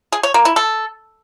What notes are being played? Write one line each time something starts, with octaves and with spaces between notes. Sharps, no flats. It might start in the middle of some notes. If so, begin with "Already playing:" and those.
G#4
C#5
A#3
E4
A4